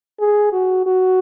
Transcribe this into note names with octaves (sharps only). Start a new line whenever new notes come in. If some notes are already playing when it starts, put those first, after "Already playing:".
G#4
F#4
F#4